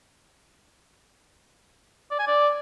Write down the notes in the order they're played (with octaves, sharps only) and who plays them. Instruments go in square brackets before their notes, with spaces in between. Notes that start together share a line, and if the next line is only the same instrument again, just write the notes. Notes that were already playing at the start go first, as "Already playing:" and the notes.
[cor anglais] D5
G#5
D5